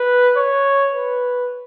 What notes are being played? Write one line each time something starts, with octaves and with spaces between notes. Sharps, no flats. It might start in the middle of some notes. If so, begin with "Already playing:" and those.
Already playing: B4
C#5
B4